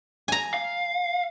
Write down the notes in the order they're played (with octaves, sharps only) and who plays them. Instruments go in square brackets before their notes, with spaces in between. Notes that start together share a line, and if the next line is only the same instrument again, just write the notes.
[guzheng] G#5 A#5
[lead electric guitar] F5